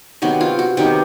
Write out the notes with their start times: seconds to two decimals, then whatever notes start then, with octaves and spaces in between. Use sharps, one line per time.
0.22 C3 D#3 F#3 B3 F#4
0.41 F4
0.59 F#4
0.77 C3 D#3 F#3 B3 G4